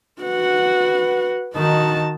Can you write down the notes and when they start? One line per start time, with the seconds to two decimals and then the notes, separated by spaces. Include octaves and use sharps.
0.22 F#4 B4 F#5
1.55 D#3 D#4 F#4 A5